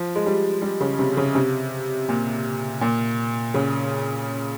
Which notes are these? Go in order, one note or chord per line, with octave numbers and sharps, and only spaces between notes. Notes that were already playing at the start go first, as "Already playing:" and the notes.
Already playing: F3
G#3
G3
G3
C#3
C3
C#3
C3
A#2
A#2
C#3